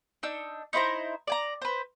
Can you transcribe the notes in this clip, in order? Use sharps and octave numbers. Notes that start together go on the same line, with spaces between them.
D4 D#4 E6
D#4 E4 C5 A#5
D5 G#5 A#5
B4 C5